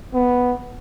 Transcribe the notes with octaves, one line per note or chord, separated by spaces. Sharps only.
B3